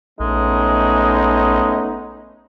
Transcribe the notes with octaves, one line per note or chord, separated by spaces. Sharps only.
A#1 G#3 A3 B3 C#4 D#4